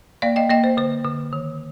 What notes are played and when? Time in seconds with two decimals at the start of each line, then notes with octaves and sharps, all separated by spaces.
0.22 A#3 D5 F5
0.36 D#5 G5
0.50 A#3 D#5 G5
0.64 C5
0.77 D3 C5
1.05 D3
1.33 D#3